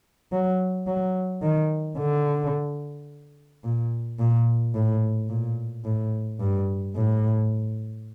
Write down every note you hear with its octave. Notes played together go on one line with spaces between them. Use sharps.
F#3
F#3
D#3
D3
A#2
A#2
A2
A#2
A2
G2
A2